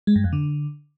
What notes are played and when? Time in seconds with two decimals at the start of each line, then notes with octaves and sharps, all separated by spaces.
0.07 G#3
0.16 G2
0.24 F2
0.33 D3